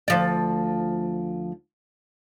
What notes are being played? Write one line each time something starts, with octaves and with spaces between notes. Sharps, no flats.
D2 F3 D5